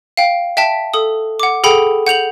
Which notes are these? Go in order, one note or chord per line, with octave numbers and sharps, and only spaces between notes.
F5 G5
E5 G5 A5 B6
A4 D#6
F#5 D6
G#4 A4 F#5 G5 B5
F#5 G6 F7 F#7